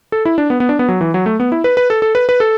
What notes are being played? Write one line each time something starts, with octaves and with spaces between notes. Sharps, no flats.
A4
E4
D4
B3
B3
D4
B3
F#3
E3
F#3
A3
B3
E4
B4
B4
A4
A4
B4
B4
A4